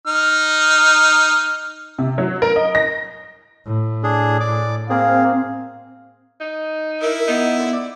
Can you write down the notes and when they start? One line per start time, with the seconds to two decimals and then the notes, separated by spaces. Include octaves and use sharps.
0.07 D#4 F6
1.98 C3
2.18 F#3
2.42 A#4
2.56 D#5
2.75 A#6
3.65 A2
4.04 D4 G#4
4.40 D5 D6
4.90 A#3 C4 G#4 F5
6.41 D#4
7.02 E4 A#4
7.28 B3 D#4
7.59 D3
7.73 D5